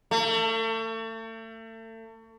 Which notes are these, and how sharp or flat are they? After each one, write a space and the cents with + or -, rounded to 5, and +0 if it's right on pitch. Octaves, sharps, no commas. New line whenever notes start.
A3 +35